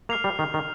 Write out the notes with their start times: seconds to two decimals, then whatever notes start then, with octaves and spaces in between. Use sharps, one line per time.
0.09 A#3 F6 C7 F7
0.24 G3
0.39 D#3
0.54 D#3